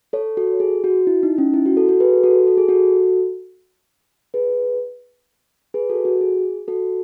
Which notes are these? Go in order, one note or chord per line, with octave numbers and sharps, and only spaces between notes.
A4 C#5
F#4 A4
G#4
F#4
E4
D#4
C#4
E4
F#4
F#4 A4
F#4 A4
G#4 B4
F#4 A4
A4
G#4
F#4 A4
G#4 B4
G#4 B4
F#4 A4
F#4
G#4
F#4 A4